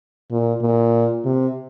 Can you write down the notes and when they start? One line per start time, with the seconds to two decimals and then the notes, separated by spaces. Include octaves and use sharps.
0.31 A#2
0.62 A#2
1.25 C3